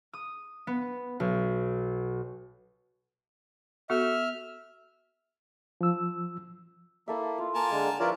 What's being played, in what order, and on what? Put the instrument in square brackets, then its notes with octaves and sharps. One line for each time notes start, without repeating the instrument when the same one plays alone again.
[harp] D#6
B3
B1
[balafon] B3 F#4 A4 [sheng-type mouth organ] E5 F6
[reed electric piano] F3 E6
[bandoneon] A#3 [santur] E4 A4 E5
[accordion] F4 [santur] F5
[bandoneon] A#3 [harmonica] A#4 G#5 A5
[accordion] D3 G#3
[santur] F3 E4 B4 [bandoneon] F4 A#4 D5 [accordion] C#5